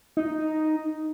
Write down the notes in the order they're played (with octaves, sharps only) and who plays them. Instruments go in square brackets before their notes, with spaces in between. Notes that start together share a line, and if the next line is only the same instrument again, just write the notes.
[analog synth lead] D#4